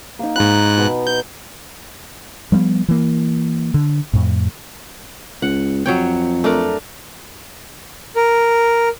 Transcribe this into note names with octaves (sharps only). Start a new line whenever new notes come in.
A#3 D#4
G#2 A#5 B5 F#6
B2 B3
C#6 G6
F3 G3 A#3 B3
E3 A#3
D3
F2 A2
C#2 F#5
F2 F#3 C#5 G5
A3 D4 A#4
A#4